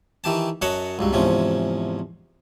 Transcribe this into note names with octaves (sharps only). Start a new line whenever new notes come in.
D#3 E3 G4 A5
F#2 C#5 D#5 F#5 A5 B5
C#2 G2 F#3
E2 G#2 C3 F3 C#4